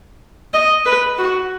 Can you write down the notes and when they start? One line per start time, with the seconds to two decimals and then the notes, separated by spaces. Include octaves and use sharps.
0.53 D#5
0.86 B4
1.18 F#4